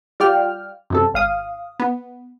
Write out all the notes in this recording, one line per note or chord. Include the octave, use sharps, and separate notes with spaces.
G3 F4 D5 G5 F6
F#2 C3 A4
G#1 F5 D#6
B3